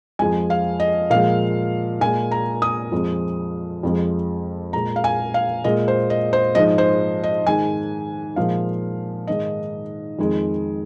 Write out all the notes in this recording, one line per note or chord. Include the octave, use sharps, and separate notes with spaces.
F2 F3 G#3 G#5
F5
D#5
A#2 F3 G#3 F5
A#2 G#3 G#5
A#5
D#6
F2 F3 G#3
F2 F3 G#3
A#2 G#3 A#5
F5
G#5
F5
A#2 G#3 D#5
C5
D#5
C5
G#2 F3 G#3 D#5
C5
D#5
G#2 D#3 G#3 G#5
A#2 F3 G#3 F5
G#2 D#3 G#3 D#5
F2 D#3 G#3